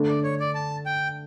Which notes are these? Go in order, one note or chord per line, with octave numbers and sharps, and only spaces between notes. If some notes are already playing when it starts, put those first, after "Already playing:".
Already playing: D3 A3 D4 A4
D5
C#5
D5
A5
G5